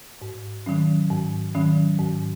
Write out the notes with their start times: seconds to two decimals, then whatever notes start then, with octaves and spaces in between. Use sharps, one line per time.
0.22 G#2
0.66 D#3 F#3 C#4
1.10 G#2
1.55 D#3 F#3 C#4
1.99 G#2